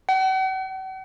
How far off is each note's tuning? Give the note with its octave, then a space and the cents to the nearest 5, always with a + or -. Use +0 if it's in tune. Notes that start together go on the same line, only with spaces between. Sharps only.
F#5 +45